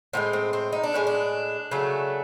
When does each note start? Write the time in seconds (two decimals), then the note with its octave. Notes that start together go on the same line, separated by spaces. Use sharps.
0.13 A2 F3 G#3 C4
0.33 C4
0.53 C4
0.72 D#4
0.83 D4
0.93 A2 F3 G#3 C#4
1.07 D4
1.71 C#3 F#3 A3